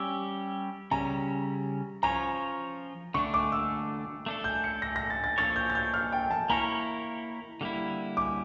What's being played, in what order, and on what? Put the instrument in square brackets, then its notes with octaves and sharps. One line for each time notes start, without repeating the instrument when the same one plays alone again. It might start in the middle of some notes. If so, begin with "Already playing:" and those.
Already playing: [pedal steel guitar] G3 C#4 G4 [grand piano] E6
[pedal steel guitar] C#3 G3 C#4 [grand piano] A#5
[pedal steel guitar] F3 C#4 F4 C#5 [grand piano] A#5
[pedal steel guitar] D3 A3 D4 [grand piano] C#6
[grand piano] D6
E6
[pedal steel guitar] A3 D4 A4
[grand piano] G6
C#7
A#6
A#6
A6
A6
[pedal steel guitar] F3 A#3 D4 A4 C#5 [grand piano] A6
[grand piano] G6
A6
G6
F6
G5
A5
[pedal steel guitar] A#3 E4 A#4 C#5 [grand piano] A#5
[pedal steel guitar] D3 G3 A#3 E4
[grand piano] D6